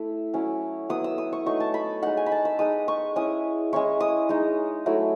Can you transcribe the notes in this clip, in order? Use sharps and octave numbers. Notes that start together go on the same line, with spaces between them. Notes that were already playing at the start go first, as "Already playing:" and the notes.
Already playing: A3 E4
F#3 C#4 E4
F#3 B3 E4 D#6
E6
D#6
C#6
F#3 A3 D#4 C#6
A5
B5
G#3 D#4 F#5
G#5
B5
A5
E6
G#3 D#4 D#6
C#6
G#3 C#4 E4 D#6
G#3 C#4 E4 C#6
D#6
G#3 D#4
F#3 A3 E4